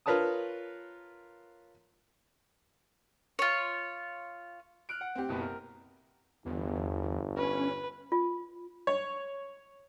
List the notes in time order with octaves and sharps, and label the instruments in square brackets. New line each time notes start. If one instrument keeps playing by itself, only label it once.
[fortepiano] F4 A#4 B4 C#5 A5 D#6
[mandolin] F4 C#5
[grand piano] F6 F#6 D7
F#5
[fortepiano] C4 G4
[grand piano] F#1 B2 B4
A#4
[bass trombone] G1 [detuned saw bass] E2
[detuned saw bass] C#4 [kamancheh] B4
[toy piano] F4
[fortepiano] C#5